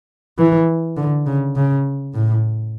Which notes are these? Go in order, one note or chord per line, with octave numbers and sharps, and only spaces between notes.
E3
D3
C#3
C#3
A2